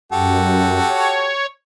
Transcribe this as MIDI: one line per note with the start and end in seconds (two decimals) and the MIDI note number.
0.12 0.79 42
0.12 1.33 66
0.12 1.33 67
0.12 1.33 69
0.89 1.46 73